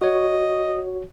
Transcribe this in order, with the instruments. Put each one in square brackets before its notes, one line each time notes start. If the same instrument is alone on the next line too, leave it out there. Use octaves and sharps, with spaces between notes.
[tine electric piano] F#4 C#5 [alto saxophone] D#5